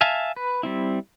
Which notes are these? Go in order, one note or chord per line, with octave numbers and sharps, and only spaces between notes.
E5 F5 G#5 A5
B4
G3 C4 E4